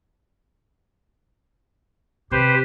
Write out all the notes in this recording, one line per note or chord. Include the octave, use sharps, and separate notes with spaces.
C3 G4 B4 C5